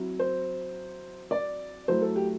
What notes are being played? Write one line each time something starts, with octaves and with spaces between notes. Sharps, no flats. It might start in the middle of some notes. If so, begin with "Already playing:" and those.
Already playing: F#3 C4 E4
C5
D5
F#3 A3 E4 C5
A4
G4